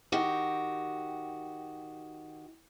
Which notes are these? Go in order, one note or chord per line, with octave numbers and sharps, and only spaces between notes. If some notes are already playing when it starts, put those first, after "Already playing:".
D#3 F#4 G4